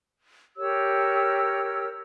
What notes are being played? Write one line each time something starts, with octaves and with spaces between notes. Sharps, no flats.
G4 A#4 C#5 E6